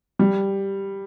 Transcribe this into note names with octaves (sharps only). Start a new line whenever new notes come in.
G3